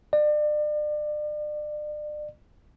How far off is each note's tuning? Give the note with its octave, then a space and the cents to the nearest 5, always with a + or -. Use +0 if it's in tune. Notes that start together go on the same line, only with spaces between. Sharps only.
D5 +35